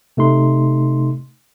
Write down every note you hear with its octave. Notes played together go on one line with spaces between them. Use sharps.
C3 A3 D#4 C6